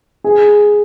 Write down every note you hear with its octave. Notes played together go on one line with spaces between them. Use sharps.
G#4